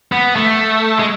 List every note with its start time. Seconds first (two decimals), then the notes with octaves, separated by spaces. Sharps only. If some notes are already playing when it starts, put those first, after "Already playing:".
0.12 B3
0.36 A3
0.99 G#3